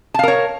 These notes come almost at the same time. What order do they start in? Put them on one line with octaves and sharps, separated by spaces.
A5 F5 A#4 C#5